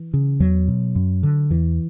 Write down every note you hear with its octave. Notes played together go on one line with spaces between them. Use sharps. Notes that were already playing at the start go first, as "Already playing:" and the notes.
Already playing: E3
C#3
E2 F#3
B2
F#2
D3
E2 E3